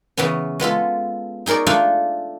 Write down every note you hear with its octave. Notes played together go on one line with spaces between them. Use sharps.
C#3 E3 B3 C#4
G#3 B3 F4 A4
D#4 G#4 A#4 C#5 D5
A3 D4 F4 A4 F5 G#5